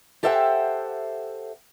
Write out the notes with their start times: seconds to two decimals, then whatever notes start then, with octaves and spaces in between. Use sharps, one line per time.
0.23 G4 A4 C5 E5 F#5 G5